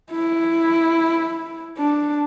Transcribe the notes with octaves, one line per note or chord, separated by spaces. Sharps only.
E4
D4